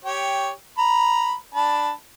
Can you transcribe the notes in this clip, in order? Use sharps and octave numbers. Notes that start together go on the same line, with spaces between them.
G4 C#5 G5
A#5 B5
D4 A5 B5